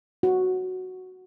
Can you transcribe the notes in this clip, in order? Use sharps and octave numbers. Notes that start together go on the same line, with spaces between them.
F#4